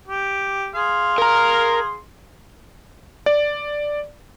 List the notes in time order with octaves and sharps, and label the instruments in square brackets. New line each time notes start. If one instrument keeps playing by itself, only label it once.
[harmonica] G4
G#4 F5 C6
[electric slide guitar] A#4 A#5
[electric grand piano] D5